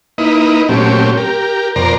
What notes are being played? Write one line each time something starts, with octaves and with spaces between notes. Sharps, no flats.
A#3 D#4 E4 B4 D#5
A#2 F#3 A3 C4 C#4 G4
G4 A#4
F2 B2 A#4 C5 D5 A#5